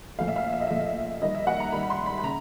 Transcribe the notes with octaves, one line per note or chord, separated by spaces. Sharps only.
A#2 F3 A3 F5
E5
F5
E5
D#5
A#2 F3 A3 E5
D#3 G3 A#3 D#5
E5
F#5
A#5
D#3 G3 A#3 B5
B5
C6
B5
B5
C#3 A#5